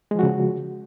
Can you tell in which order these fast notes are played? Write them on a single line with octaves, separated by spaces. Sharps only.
G#3 F3 F#4 C#3